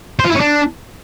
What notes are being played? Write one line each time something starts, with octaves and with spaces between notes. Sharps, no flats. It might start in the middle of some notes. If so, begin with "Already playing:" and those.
C5
F4
E4
C#4
D4